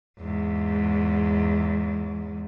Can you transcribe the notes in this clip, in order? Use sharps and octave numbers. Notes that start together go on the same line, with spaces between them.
E2 G#2